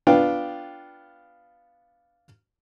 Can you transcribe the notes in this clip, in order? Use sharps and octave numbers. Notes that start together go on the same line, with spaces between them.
B3 D4 F4 G5